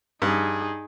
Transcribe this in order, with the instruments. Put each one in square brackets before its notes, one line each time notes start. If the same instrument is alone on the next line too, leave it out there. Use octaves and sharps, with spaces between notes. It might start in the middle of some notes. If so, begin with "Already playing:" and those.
[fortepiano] G2 [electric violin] D#4 G#4